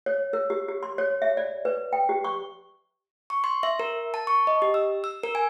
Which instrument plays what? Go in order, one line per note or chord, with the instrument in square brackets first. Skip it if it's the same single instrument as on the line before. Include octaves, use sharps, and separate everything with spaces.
[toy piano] C#5
A#4
G4
G4
C6
C#5
E5
D5
B4
G5
G4
C#6
[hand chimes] C#6
C6
E5
A#4
A5
C#6
D#5
G4
E6
E6
A#4
G#5